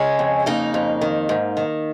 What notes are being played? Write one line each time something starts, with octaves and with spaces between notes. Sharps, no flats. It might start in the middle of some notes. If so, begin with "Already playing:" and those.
Already playing: C#3 G#3 C#4
F2
C#3 A#3 D#4
F2
D#3
G#2
D#3